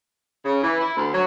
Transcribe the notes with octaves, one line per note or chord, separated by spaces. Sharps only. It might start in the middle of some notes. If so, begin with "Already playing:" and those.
C#3
E3
E4
D2
F#3